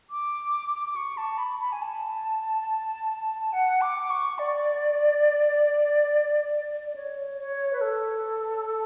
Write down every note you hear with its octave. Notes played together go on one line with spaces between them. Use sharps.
D6
D6
C#6
A5
B5
B5
G#5
A5
F#5
D6
C#6
D5
D5
C#5
C#5
B4
A4